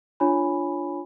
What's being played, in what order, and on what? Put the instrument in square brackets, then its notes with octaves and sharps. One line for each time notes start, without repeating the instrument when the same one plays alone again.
[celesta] D4 F4 C#5 G#5 B5